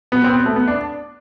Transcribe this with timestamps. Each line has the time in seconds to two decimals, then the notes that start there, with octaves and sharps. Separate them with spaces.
0.12 B2 F#3 B3
0.24 C4
0.29 B3
0.46 A3
0.56 B3
0.68 D4